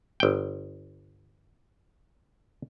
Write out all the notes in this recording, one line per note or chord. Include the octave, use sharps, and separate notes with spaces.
G1 G5